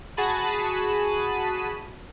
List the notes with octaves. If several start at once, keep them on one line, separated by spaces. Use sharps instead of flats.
F#4 G#4 A5 B5 D#7